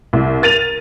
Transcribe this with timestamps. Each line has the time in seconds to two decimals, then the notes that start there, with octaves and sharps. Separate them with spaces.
0.13 C2
0.42 A#4 A6 D#7 F7